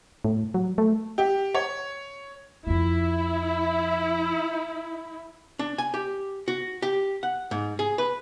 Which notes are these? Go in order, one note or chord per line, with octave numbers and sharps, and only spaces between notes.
A2
F#3
A3
G4
C#5
F2 F3 E4
D4
G#5
G4
F#4
G4
F#5
G#2
G#4
B4